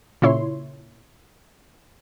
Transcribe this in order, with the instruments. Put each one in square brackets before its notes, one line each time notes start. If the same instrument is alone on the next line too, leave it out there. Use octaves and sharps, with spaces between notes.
[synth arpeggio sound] A#2 C#3 E4 C#5 C6